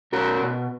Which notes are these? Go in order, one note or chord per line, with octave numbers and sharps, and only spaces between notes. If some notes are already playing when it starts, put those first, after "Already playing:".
B2 F#4 A#4
B2